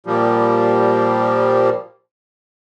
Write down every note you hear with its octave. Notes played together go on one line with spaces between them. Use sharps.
A#2 F3 G3